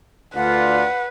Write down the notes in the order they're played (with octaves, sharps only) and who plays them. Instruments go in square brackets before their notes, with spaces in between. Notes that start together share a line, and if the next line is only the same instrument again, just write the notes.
[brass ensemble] D2 D4 F4 [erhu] B4 [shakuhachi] F#5